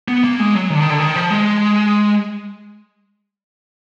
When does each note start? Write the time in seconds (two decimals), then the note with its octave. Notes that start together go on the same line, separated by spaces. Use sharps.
0.08 B3
0.24 A#3
0.40 G#3
0.55 F#3
0.70 D#3
0.75 D3
0.80 D#3
0.90 D3
1.00 D#3
1.15 F3
1.30 G#3